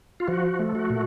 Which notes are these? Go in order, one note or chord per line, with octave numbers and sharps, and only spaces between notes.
F4
F3 F#4
A3
F#4
A#2